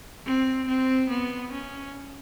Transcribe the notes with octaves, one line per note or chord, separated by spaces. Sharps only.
C4
C4
B3
C#4